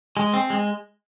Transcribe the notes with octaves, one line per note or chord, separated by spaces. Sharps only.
G#3
C4
G#3